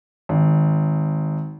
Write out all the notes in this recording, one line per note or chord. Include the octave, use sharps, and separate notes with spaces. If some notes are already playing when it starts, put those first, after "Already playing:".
G#1